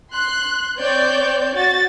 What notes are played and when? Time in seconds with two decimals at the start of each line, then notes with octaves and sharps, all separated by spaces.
0.12 C6 F#6
0.79 C4 C#5 D5 G6
1.56 F#4 A6